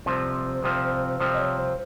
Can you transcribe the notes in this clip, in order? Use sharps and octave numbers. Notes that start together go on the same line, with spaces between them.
C2 C3 F3 C5
C2 C3 F3
C2 C3 F3 C5
D#5
C#5
C5